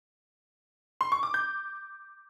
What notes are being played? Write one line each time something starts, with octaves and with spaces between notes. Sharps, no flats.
C6
C#6
D6
G6